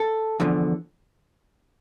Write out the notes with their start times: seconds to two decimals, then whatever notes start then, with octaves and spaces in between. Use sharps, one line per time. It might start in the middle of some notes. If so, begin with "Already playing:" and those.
Already playing: A4
0.40 E2 D3 F3